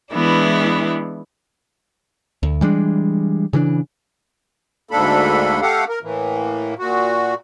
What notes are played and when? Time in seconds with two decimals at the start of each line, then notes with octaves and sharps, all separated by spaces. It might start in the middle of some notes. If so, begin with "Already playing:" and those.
0.12 E3 G#3 B3 D4 E4
2.43 D2
2.61 E3 G3 G#3 D4
3.53 C#3 E3 C#4 D4
4.91 D2 G#2 A#3 D4 A4 B5
5.62 A3 G4 A4 F5 F#5
5.89 A#4
6.02 A2 E3 A#3
6.79 A#2 F#4